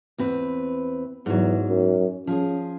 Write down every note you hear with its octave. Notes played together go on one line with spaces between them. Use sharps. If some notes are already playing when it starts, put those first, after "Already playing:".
E2 C4 B4
E2 G#2 F#3
F#2
F3 C#4 G#4